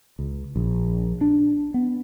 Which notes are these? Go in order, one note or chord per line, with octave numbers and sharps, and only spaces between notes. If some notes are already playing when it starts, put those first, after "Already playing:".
C#2
A#1
D4
B3